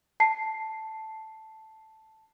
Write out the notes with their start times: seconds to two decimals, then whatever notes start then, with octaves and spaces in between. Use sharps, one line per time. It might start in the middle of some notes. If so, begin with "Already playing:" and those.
0.20 A5 C7